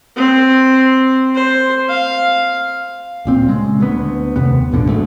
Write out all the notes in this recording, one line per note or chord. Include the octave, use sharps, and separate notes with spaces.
C4
C5
F5
D1 A#2 C4
C#3 G#3
D2 B3
F1 D#2 C3 B3
A1 F2 B2 D3
D2 G#2 A3